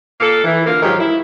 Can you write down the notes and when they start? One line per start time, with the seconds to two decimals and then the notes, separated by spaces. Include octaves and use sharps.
0.21 A#2 A#3 A4
0.44 E3
0.66 D3 A#3 F4 A#4
0.83 G#2 D#3 F3 F#3 G4
1.00 E4